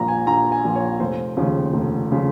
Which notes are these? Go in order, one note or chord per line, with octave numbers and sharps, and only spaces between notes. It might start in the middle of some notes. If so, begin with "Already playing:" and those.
Already playing: A#1 A#2 F3 A#5
G#5
A#1 A#5
G#5
A#2 F3
C#5
F1 C5
D#2 C#3 F3
F1
C#3 F3